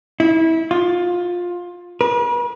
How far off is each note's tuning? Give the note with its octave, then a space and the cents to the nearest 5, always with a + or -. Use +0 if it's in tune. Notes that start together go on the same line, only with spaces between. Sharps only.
E4 -25
F4 +20
B4 -45